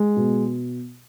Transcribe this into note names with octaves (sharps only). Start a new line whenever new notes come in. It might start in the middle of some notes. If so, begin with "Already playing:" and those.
Already playing: G#3
B2